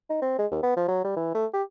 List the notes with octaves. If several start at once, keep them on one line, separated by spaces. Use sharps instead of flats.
D#4
C4
G#3
D#2
B3
F3
F#3
G3
E3
A3
G4